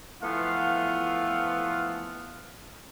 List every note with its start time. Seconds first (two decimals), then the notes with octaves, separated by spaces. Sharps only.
0.22 E3 F3 A3 B3 F4 F5